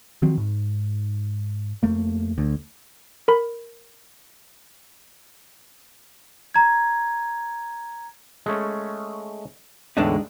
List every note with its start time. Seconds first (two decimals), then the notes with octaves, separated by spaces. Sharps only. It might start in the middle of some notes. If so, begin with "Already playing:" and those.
0.22 D#3 F3 F#3 C4
0.38 G#2
1.83 F2 A3 A#3
2.38 D2
3.28 A#4 B5
6.54 A#5 G#6
8.46 G#3 A3 C#4
9.97 E2 A2 D3 G#3 D4 D#4